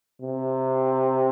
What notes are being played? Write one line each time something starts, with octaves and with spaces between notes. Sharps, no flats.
C3